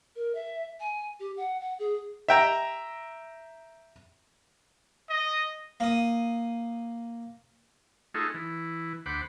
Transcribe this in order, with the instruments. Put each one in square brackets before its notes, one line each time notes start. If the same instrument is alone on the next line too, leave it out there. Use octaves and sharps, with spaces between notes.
[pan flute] A#4
E5
G#5
G4
F#5
F#5
G#4
[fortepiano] E5 G5 A#5
[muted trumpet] D#5
[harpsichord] A#3 D#6
[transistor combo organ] A3 D#4 F4 F#4 G#4 A4
E3
D2 C5 F#5 B5 D6